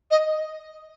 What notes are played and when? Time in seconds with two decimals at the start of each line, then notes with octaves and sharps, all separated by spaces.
0.11 D#5